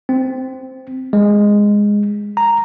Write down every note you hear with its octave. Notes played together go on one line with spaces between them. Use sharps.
C4
G#3
A#5